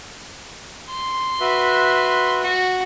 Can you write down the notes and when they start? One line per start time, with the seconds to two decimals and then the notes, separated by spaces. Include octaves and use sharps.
0.90 C6
1.41 F#4 B4 E5
2.42 F#4